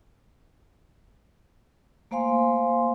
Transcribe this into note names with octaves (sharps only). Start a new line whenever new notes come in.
A3 A#3 C5 F5 G#5 C6